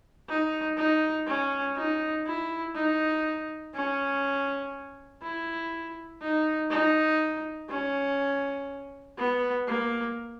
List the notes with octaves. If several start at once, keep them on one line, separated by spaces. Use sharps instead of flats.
D#4
D#4
C#4
D#4
E4
D#4
C#4
E4
D#4
D#4
C#4
B3
A#3